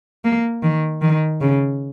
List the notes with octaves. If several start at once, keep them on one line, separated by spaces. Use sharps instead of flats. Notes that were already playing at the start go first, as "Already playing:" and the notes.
A#3
D#3
D#3
C#3